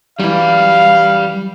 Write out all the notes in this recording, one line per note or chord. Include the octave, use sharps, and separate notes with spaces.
F#2 E3 G3 F5